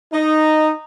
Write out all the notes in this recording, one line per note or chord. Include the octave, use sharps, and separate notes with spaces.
D#4